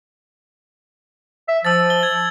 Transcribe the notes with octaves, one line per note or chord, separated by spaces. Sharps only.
E5
F3 E6 A6
G7
G#6